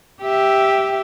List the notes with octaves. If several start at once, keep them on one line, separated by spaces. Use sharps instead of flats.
G4 E5